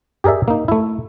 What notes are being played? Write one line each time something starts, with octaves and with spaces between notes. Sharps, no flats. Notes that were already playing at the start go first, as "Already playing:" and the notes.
G4 G#4 A#4 D5 E5
A#3 D#4
A3 E4